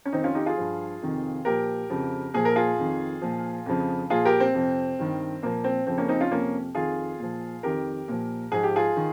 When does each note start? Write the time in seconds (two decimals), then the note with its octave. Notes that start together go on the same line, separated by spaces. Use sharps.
0.05 C#4
0.13 F2 D#3 C4 D#4
0.24 C#4 F4
0.35 D#4 G4
0.46 F4 G#4
0.57 G2 F3
1.02 F2 C3 D#3
1.45 A#2 F3 G4 A#4
1.90 F2 C#3 F3
2.34 A#2 F3 G#4
2.45 A#4
2.56 F4 G#4
2.78 F2 D#3
3.22 A#2 F3
3.66 F2 C#3 F3
4.10 A#2 F3 F4 G#4
4.25 G4 A#4
4.40 C4
4.54 F2 C3 F3
4.99 G2 D#3
5.42 A#2 F3 A#3
5.64 C4
5.87 F2 C#3 F3 C4
5.98 A#3 C#4
6.08 C4 D#4
6.21 C#4 F4
6.31 F2 C3 F3 A#3 C#4
6.75 F2 D#3 F4 G#4
7.19 A#2 F3
7.63 F2 D#3 G4 A#4
8.08 A#2 F3
8.51 G#2 F3 G#4
8.63 G4
8.76 F4 G#4
8.97 D#3